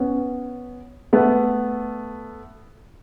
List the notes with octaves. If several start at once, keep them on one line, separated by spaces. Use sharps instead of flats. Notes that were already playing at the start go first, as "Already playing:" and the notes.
Already playing: B3 C#4
A3 B3